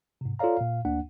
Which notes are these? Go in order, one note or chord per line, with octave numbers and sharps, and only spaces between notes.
G#2 C3
F4 A4 C#5 D5 F5 A#5
A#2 F5
D2 A#3 D4 F#5